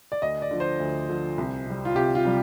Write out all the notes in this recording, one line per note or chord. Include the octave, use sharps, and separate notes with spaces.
D5
D2 D#5
D5
D3 F3
C5
D2
D3 F3
C2
C3 G3
F4
C2 G4
F4
C3 G3